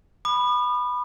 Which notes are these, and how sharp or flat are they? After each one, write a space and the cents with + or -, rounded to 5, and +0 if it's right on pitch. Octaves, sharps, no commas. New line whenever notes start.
B5 +0 D#6 -45